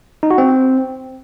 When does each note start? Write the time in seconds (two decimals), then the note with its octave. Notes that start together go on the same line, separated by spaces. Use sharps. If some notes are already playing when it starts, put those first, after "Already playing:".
0.23 D#4
0.31 F#4
0.38 C4